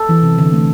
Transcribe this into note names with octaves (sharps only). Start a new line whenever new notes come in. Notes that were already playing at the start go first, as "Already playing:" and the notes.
Already playing: A4
E3
C3
D3
A3